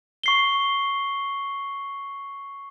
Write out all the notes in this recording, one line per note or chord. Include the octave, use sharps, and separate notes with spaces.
C#6 C7 G7